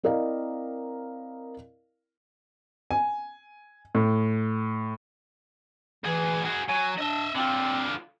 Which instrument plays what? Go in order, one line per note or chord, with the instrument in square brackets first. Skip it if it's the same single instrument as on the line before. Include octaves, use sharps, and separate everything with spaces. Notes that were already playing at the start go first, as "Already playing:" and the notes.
[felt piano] C4 E4 A#4 D5 D#5 F5
[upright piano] G#5
A2
[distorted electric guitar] D2 G#4 [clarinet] E3
[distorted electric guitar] F#4 G#4
[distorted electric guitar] F#3 [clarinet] G#5
[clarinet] D4 [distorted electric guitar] D#5 E5
[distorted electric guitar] D3 F4 [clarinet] C4